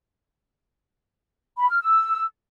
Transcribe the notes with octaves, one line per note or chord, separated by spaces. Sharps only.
B5
F6
E6